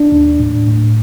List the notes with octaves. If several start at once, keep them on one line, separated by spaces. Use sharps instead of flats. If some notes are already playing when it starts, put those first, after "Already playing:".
Already playing: D4
D#2
A2
A2